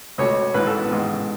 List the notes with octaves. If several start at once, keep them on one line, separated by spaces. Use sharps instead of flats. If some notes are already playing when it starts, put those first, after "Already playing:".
C#2 B2 A3 C#5
A1 G#2 E3 B4
A4
B3
A1 G#2 G#3